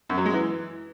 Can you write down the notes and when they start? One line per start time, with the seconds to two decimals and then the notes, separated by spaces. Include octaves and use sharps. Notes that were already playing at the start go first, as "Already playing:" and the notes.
0.10 F#2
0.18 F#3
0.26 G#3
0.34 E3